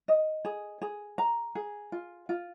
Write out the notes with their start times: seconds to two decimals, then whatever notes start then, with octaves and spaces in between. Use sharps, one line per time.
0.08 D#5
0.45 G#4
0.82 G#4
1.18 A#5
1.55 G#4
1.92 F4
2.29 F4